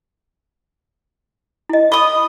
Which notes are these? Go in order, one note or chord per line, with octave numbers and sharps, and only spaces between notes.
E4 D#5
D#5 B5 D#6